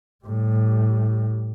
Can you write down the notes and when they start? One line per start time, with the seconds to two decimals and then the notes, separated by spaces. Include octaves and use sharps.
0.24 A2 G3